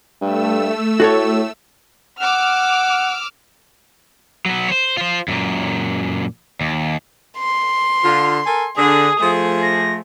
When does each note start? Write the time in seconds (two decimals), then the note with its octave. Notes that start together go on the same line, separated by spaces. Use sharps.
0.21 G2 A3 E6
1.00 A2 F#4 A4 C#5
2.19 F#5 D6 E6 F6
4.46 F#3 B3
4.68 C5 C#5
4.97 F4 C5
5.28 F#2 A#2
6.61 D#2
7.38 C6
8.04 D3 F4
8.45 A4 A#4 G#5
8.77 D3 G#4 D#6
9.20 F3 A3 G#4
9.62 A#6